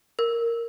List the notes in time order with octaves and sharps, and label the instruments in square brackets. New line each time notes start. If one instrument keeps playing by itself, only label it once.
[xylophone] A#4